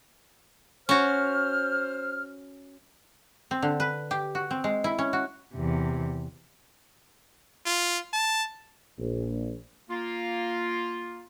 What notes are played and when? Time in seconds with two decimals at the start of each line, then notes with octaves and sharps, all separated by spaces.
0.89 C#4 F#4 C5 F6
3.51 C4
3.62 D3
3.80 B4
4.11 G4
4.35 F#4
4.51 C4
4.64 G#3
4.84 E4
4.99 C#4
5.13 F#4
5.54 E2 C3
7.66 F4
8.13 A5
8.99 A#1
9.90 A#3 F4